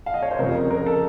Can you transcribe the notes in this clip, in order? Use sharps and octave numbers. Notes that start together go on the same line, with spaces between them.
F5
D#5
C#5
C5
F2 C#3 A#4
A#4
A4